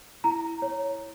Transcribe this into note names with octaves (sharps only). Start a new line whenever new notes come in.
E4 A#5
C#5